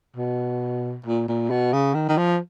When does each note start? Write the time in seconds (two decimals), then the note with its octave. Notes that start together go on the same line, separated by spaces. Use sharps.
0.16 B2
1.06 A#2
1.28 A#2
1.50 B2
1.73 C#3
1.95 D#3
2.09 D#3
2.18 F3